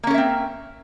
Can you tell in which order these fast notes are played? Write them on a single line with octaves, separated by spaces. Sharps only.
A#3 C#4 A#4 E5 C4